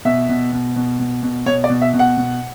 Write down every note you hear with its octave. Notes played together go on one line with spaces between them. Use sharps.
B2 E5
B2
B2
B2
B2
B2
B2 C#5
D5
B2
E5
B2
F#5
B2